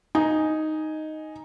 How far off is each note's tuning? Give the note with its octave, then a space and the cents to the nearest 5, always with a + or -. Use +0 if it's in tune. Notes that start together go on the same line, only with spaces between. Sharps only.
D#4 +0 D#5 +0 G#5 +0